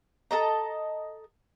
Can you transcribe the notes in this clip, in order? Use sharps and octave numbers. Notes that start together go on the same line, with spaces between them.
A4 D#5 A#5